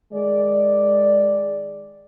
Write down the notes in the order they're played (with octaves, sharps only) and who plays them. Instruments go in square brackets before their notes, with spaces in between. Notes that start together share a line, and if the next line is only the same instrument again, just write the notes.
[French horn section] D#3 G#3 D5